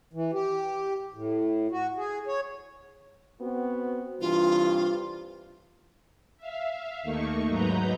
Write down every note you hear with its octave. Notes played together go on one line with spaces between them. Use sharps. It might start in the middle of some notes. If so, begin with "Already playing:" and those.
E3
G4
A2
F#4
G#4
C#5
B3 C4 F#4
G2 C3 E3 F4
E5 F5
D#2 A3 A#3 D#4 C#6
G#2 F#3 D#4 B4 A#5 G6